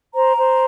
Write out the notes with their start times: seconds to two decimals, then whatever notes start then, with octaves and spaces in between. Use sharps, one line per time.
0.15 C5 A#5
0.37 C5